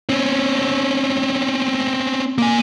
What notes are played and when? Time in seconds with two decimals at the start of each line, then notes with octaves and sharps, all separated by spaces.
0.09 C4 C#4
2.38 A#3 G#5